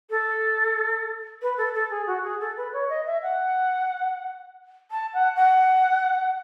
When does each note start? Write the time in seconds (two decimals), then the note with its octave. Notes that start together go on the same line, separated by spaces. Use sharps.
0.10 A4
1.42 B4
1.58 A4
1.75 A4
1.91 G#4
2.07 F#4
2.24 G#4
2.40 A4
2.57 B4
2.73 C#5
2.89 D#5
3.06 E5
3.23 F#5
4.91 A5
5.14 F#5
5.36 F#5